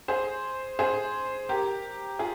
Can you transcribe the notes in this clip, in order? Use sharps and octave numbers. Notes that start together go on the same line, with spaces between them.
G#4 C5
G#4 C5
G4 A#4
F4 G#4